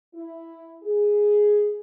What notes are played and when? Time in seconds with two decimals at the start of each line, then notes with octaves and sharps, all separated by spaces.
0.15 E4
0.83 G#4